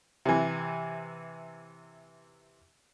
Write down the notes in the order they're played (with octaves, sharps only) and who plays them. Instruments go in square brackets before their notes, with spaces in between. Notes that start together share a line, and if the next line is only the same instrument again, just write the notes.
[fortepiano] C3 E3